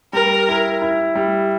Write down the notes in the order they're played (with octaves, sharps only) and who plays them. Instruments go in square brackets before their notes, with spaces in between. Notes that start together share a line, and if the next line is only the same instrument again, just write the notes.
[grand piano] G3 [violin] A#4
[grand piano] E4
E4
G3